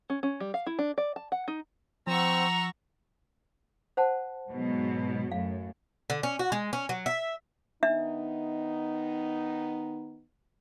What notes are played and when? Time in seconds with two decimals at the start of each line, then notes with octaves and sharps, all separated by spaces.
0.10 C#4
0.23 C#4
0.40 G3
0.54 F5
0.67 E4
0.79 D4
0.98 D5
1.16 A5
1.32 F#5
1.48 D#4
2.07 F3 C4 F#5 A#5 C#6 E6
3.97 C5 F#5 A5
4.49 G#2 B2 F#3
5.32 F#2 A2 F5
6.10 D3
6.23 C#4
6.39 F#4
6.52 G#3
6.73 C#4
6.89 F#3
7.06 E5
7.83 D#3 B3 D4 D#4 E5